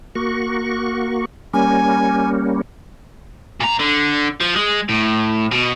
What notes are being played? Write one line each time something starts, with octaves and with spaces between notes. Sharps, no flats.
A#3 F#4 C#6
G3 A#3 C#4 G#5
A#2 A#5
D3
F3
G#3
A2
B2